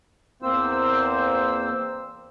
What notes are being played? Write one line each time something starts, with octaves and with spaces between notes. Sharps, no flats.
E2 A#3 C4 C5 E6